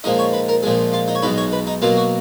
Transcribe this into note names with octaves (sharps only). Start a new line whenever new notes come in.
A#2 F3 G#3 D#4 D#5
C#5
B4
A#4
A#1 A#2 F3 G#3 G#4
F4
D#4
C#5
B1 B2 G#3 D#4 B4
C#5
B4
D#4
B2 F#3 A#3 F4
F#4